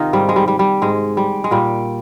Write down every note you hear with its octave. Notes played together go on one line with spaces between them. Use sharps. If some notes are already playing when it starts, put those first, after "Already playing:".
Already playing: C3 D#3 D#4 F4
G#2 G3
G#3
G3
G3
G3
G#2 G#3
G3
G#3
A#2 G3